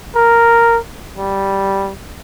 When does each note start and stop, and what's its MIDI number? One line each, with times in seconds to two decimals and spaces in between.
0.16 0.78 70
1.17 1.93 55